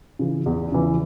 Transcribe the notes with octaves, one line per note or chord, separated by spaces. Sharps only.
C#3 E3
E2
C#3 E3